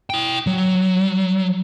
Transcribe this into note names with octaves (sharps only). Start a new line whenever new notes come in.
E4 G5
F#3